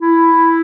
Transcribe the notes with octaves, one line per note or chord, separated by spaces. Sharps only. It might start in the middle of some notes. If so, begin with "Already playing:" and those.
E4